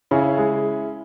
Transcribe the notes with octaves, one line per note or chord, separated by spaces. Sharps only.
C#3 C#4 E4
G#3